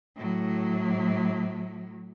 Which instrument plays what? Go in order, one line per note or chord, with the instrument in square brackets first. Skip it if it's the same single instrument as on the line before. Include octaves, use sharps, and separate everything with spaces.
[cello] A2 F#3